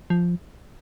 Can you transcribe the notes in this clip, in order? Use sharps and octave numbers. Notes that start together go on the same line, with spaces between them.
F3